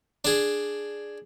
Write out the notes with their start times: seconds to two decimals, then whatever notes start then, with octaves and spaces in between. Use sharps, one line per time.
0.25 D4 G#4